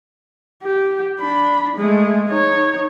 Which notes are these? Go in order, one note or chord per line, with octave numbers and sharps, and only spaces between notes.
G4
D4 B5
G#3 A3
D#4 C#5